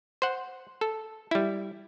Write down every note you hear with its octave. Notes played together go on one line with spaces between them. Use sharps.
C5 F#5
A4
G3 E4